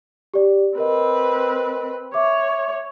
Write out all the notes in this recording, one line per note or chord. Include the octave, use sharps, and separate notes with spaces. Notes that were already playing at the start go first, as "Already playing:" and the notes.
G4 D5
C4 A#4 B4 D#5
C#5 E5 D6